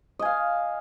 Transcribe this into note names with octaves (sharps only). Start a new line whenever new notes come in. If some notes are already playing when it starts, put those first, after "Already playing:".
D#5 F5 G#5